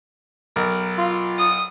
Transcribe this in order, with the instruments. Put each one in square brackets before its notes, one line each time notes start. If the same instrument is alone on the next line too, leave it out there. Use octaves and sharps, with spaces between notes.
[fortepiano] B1 A#4
[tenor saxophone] F4
[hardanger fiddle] D#6